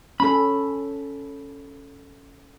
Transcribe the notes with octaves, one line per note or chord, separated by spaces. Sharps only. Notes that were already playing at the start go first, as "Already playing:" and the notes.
C#4 A4 B5